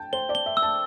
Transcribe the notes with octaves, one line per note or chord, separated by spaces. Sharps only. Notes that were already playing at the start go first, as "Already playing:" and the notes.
Already playing: G5 A5
C5 G7
D5
G7
E5
E6
A5